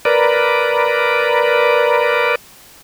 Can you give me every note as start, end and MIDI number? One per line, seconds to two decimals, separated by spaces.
0.05 2.35 70
0.05 2.35 71
0.05 2.35 74